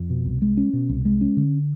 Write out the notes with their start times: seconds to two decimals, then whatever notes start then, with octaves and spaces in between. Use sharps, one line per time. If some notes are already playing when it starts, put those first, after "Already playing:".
Already playing: F2
0.10 B2
0.25 C2
0.42 G#3
0.57 C#4
0.73 B2
0.89 C2
1.05 G#3
1.21 C#4
1.37 D3